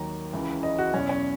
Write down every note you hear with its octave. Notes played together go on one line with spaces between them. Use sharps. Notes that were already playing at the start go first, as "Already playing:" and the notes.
Already playing: D#2 D#3 F#3 A#5
C#2 C#3 E3
D#5
F#4
E2 B2 F#3 C#4
C#4